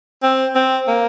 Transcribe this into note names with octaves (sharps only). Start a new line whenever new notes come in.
C4
C4
A#3